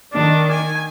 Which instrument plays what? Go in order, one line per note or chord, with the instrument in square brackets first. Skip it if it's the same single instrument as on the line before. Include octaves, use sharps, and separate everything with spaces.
[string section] D#3 [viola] D4
[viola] G#5